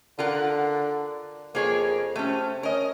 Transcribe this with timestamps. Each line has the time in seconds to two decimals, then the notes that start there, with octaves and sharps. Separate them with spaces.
0.19 D3 F4 A#4 F#5
1.55 F2 A#3 G#4 C#5
2.16 C3 A3 C#4
2.63 C#4 A#4 D#5